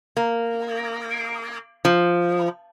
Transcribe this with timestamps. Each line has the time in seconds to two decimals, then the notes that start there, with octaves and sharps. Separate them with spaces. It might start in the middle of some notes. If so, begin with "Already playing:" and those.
0.17 A#3
1.85 F3